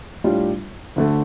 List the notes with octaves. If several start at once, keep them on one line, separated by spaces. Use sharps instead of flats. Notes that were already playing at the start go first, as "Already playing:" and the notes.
A2 G3 D4 F4
D2 D3 A3